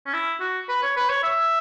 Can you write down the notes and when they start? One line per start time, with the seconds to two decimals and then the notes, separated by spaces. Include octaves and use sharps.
0.06 C#4
0.13 E4
0.40 F#4
0.69 B4
0.83 C#5
0.97 B4
1.09 C#5
1.23 E5